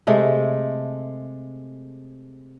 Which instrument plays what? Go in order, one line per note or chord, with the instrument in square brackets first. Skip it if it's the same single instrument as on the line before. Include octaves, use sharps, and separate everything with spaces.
[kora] C3 G#3 A3